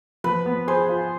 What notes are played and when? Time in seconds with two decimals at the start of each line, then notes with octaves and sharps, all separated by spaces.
0.24 F3 B4
0.46 B3
0.67 G#4 C5
0.89 F4